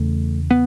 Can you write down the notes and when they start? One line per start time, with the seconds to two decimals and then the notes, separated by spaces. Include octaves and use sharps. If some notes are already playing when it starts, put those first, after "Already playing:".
Already playing: E2 C#3 A3
0.51 B3